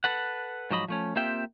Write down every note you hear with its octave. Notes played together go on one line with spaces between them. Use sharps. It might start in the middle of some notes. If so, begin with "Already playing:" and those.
A4 B4 F#5
G#2 F3 F#3 D#5 B5
F3 A3 C#4
A#3 C4 F4 G4 E5 G5